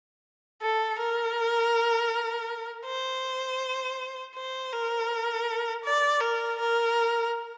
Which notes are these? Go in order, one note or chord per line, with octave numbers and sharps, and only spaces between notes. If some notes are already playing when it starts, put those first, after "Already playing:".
A4
A#4
C5
C5
A#4
D5
A#4
A#4